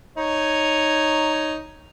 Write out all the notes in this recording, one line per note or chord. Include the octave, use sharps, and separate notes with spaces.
D#4 C#5